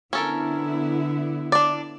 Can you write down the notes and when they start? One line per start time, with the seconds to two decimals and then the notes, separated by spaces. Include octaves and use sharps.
0.13 D3 B3 C#4 E4 A4 A#4
1.52 D4 D5